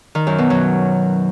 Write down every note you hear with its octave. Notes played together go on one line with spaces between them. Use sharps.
D#3
F#2
B2
F#3